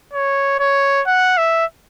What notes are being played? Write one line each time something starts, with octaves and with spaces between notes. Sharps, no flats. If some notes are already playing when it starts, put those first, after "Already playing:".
C#5
C#5
F#5
E5